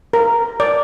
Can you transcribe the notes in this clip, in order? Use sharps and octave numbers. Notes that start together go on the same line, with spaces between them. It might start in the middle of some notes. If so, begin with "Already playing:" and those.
A#4
D5